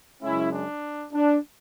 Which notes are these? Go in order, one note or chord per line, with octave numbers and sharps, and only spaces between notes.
F#2 C#3 G#3 C#4 E4
D4
D4